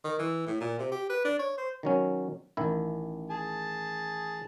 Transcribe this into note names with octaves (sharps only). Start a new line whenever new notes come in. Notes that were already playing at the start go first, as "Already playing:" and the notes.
D#3
E3
A2
A#2
C3
G4
B4
D4
C#5
C5
D#3 F#3 C#4
A1 D#3 E4
G#4 A5